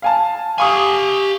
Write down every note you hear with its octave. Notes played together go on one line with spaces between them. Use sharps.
F5 G#5 A5
G4 F5 G#5 C#6 D#6